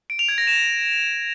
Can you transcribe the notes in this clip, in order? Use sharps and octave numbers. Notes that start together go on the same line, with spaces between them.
D7
F7
G#6
A#6
E7